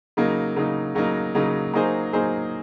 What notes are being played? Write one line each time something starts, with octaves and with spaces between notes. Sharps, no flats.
C#3 F#3 A#3 D#4
C#3 F#3 A#3 D#4
C#3 F#3 A#3 D#4
C#3 F#3 A#3 D#4
F#3 A#3 D#4 G#4 C5
F#3 A#3 D#4 G#4 C5